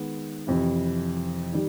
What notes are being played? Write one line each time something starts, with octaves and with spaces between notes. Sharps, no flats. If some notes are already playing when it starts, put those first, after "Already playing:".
Already playing: D#3 G#3 B3
F2 C3 E3
D#3 G3